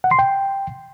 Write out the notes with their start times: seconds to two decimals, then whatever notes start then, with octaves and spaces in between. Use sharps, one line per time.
0.04 F#5
0.11 C6
0.19 G5